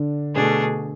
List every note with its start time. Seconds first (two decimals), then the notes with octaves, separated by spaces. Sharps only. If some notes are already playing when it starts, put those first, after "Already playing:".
Already playing: D3 D4
0.34 B2 A3 D4 G#4